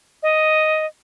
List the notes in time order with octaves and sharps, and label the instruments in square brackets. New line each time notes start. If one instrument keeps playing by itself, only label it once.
[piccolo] D#5